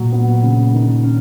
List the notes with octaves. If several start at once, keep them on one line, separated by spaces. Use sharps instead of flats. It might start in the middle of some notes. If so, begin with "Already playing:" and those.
Already playing: A#2 F#3
B3
C#3
D#3
C#4